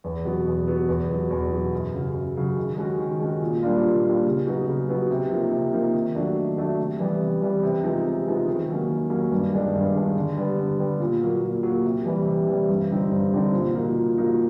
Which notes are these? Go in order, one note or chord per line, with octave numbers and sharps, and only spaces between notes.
E2
B2 F#3 B3
E2
B2 F#3 B3
E2
B2 F#3
E2
B2 F#3
F#2
C#3 F#3
F#2
C#3 F#3
D#3
G#3 C#4 F#4
D#3
G#3 C#4 F#4
A#2
G3 A#3 D4 F4
A#2
G3 A#3 D4 F4
C#3
F#3 B3 D#4 F#4
C#3
F#3 B3 D#4 F#4
C3
F3 A#3 D#4
C3
F3 A#3 D#4
D#3
F#3 A3 D4
D#3
F#3 A3 D4
C3
E3 G3 B3
C3
E3 G3 B3
C3
F3 G#3 B3 D#4
C3
F3 G#3 B3 D#4
D#3
F#3 A#3 C#4
D#3
F#3 A#3 C#4
G2
D#3 G#3 B3 D4
G2
D#3 G#3 B3 D4
D3
G3 B3
D3
G3 B3
A#2
F#3 A#3
A#2
F#3 A#3
C3
E3 G3
C3
E3 G3
G2
D3 G3 C4 D#4
G2
D3 G3 C4 D#4
A#2
F3 A#3 D#4 F#4
A#2
F3 A#3 D#4 F#4